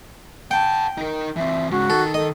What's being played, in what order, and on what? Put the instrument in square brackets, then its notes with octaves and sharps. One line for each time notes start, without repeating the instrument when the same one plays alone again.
[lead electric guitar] F#5 A5 [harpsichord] G5
[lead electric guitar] D#4 A#4
[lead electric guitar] E3 C4 [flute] E5
[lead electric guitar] G#2 C#3 [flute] F#4
[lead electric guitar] D#3 [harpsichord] A4
[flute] A4 [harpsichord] D#5